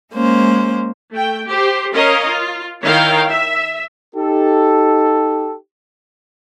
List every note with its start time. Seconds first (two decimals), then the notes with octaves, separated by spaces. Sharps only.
0.14 G#3 A#3 C#4 C5
1.13 A3 G5
1.47 G4 C5
1.92 C#4 A#4 C#5 D#5 F5
2.30 F4
2.83 D#3 E4 C#5 F5 G5 A#5
3.30 E5
4.15 D#4 G4 A4